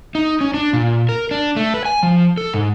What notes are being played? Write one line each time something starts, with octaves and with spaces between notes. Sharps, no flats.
D#4
C#4
D4
A#2
A#4
D4
A3
B4
G#5
F3
A4
G#2